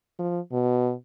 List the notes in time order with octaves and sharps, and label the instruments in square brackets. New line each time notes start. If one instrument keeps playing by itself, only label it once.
[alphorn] F3
B2